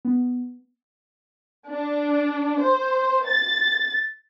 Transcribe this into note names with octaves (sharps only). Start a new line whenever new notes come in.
B3
D4
C5
A6